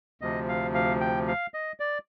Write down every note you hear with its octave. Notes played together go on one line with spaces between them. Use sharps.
D2 C3 F3 D#5
F5
F5
G5
F5
D#5
D5